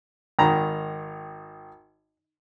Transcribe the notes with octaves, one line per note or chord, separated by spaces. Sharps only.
G#1 D#3 A#5 B5